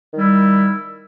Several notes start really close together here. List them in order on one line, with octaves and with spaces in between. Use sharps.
D#3 G3 E4